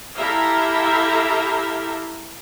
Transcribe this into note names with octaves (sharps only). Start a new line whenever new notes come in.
E4 G4 A4 E5 F5 A#5